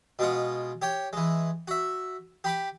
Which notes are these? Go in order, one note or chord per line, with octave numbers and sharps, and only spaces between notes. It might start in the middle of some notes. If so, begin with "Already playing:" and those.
B2 G#3 F4 F#5
G4 C#5 G5
E3 G#3
F#4 E5
G4 B5 D6